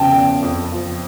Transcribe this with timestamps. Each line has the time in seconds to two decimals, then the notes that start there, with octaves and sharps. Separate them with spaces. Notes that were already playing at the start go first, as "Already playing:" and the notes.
Already playing: E2 C#3 F3 G5 A5
0.13 E2
0.42 F2
0.72 F3